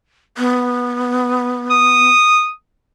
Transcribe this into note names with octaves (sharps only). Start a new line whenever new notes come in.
B3
D#6